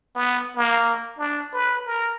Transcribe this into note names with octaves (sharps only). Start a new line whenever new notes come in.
B3
A#3
D4
B4
A#4